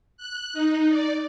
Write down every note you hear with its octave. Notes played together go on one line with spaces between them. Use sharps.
F#6
D#4
D5